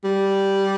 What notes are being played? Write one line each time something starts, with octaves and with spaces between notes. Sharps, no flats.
G3